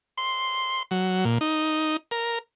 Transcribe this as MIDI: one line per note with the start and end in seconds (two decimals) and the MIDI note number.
0.17 0.83 84
0.91 1.25 54
1.25 1.38 46
1.41 1.97 63
2.11 2.39 70